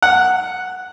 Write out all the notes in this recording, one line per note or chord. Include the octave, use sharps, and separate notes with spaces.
F#5